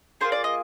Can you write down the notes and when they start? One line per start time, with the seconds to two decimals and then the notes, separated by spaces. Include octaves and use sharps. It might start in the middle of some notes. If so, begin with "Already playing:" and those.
0.21 A#3 F4 G#4 C5
0.32 D5
0.44 D#5